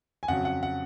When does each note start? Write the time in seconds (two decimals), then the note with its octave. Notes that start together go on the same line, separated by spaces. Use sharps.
0.23 G#5
0.28 F2 C#3 F#3 F#5
0.45 F#5
0.63 F#5